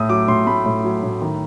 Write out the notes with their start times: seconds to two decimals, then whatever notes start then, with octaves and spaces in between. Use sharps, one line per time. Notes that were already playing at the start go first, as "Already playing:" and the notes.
Already playing: A2 A3 D#6
0.09 F#3 D6
0.28 A2 C6
0.47 A3 B5
0.66 A2
0.84 F#3
1.03 A2
1.21 D#3